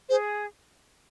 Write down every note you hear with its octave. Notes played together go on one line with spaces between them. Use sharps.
G#4 C5